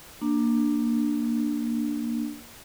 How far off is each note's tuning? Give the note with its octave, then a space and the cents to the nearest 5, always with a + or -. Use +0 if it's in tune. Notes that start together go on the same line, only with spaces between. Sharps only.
A#3 +0 D4 +10